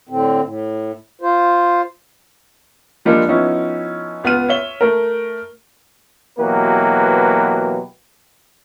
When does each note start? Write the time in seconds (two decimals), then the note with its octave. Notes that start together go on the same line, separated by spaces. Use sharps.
0.09 A2 D3 C4
0.42 A2
1.21 F4 C5
3.05 F3 G3 G#3 A#3 D4
3.29 F3 B3 C#4 D#4 E4
4.24 C#2 B3 B4 F6 D#7
4.49 C#5 E5 G7
4.81 A3 A#4
6.39 B2 E3 F#3 A#3 G4 B4